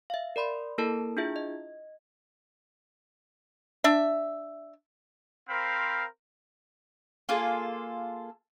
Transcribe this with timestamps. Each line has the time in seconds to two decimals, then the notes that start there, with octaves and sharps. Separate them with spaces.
0.10 E5 F5
0.36 A#4 D5 B5 C6
0.78 A#3 E4 A4 A#4 A5
1.17 D4 E4 F4 G#4 E5
1.36 D#5
3.84 D4 E5
5.49 C4 A#4 C5 F5 B5
7.29 A#3 F4 G#4 A4